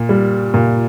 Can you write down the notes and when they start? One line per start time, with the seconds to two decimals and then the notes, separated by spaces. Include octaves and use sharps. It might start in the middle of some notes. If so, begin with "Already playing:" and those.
Already playing: A#2
0.09 G3
0.54 A#2